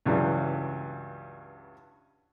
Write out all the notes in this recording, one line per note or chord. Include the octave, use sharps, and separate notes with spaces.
C#2 G2 C#3 E3 F#3 G3